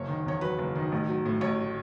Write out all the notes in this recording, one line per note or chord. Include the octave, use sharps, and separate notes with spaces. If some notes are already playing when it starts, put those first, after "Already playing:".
Already playing: F#1 C#5
D#3
E2 C#5
F#3 B4
F#1
D#3
A1
F#3
A2
A1 C#5